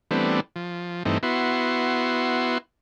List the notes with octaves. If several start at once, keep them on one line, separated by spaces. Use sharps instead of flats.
E3 G3 A3 B3 C4 D4
F3
G2 E3 A3 C4 D#4
B3 E4 F#4 C6